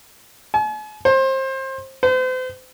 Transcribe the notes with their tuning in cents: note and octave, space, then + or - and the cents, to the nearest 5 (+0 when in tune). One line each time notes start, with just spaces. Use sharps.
G#5 +45
C5 +25
C5 -40